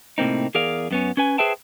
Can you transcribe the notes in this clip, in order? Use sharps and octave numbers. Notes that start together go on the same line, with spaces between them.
A2 C3 A#3 C4 D#4
E2 G#4 A#4 D5 F5
F#2 B3 C#4
C#4 B4 G#5
G#4 B4 C5 E5 G5 A5